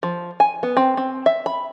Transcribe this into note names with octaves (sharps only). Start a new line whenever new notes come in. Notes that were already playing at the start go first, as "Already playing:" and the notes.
F3
G#5
B3
C4
C4
E5
B5